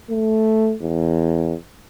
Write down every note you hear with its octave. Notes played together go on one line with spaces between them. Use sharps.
A3
E2